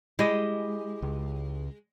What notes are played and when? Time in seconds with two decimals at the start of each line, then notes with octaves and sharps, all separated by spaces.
0.19 G#3 E4 G4 D#5
1.02 C#2